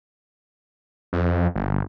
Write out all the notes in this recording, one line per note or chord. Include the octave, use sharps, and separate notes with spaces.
F2
G1